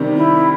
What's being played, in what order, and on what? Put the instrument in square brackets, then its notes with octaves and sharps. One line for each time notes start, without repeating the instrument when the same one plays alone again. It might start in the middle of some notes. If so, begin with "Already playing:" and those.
Already playing: [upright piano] C3 D#3 G3
[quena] E4